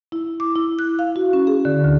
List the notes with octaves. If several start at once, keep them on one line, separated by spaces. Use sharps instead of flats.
E4
D6
E4
F#6
F5
F#4
C#4
G#4
D3
D2